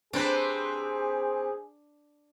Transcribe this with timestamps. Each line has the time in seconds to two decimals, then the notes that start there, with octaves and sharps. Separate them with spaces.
0.13 C3 C4 D4 G#4 B4